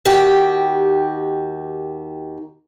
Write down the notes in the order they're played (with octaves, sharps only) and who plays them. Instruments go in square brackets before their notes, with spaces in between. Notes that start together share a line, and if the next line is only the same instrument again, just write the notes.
[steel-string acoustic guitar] D#2 D#3 F#4 G4 G5